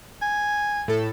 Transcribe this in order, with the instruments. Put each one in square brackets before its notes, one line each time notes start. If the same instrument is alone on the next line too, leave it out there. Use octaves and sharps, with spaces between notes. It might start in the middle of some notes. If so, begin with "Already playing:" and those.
[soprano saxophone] G#5
[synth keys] A2 A4